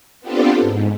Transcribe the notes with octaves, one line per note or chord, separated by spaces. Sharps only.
B3 C4 D4 F4 G4 A4
G#2